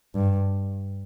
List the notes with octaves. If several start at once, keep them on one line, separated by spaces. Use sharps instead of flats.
G2